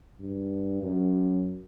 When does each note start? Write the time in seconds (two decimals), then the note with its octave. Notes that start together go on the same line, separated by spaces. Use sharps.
0.20 G2
0.83 F#2